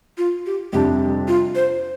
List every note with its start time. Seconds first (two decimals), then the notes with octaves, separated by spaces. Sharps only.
0.18 F4
0.46 G4
0.73 F2 C3 G3 D4 G4
1.28 F4
1.55 C5